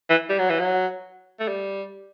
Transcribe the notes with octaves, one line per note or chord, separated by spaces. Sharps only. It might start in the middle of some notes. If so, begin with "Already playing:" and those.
E3
G3
F#3
E3
F#3
A3
G3